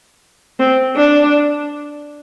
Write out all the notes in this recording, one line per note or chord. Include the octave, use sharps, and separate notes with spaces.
C4
D4